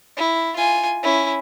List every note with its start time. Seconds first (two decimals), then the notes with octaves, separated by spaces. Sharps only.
0.17 E4
0.56 F4 G#5
1.03 C#4 E4